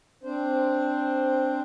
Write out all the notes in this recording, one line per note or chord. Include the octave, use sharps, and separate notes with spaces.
C4 D4 C5